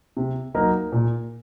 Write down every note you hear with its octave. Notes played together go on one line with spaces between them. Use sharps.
C3
F#3 A#3 D#4 A#4
A#2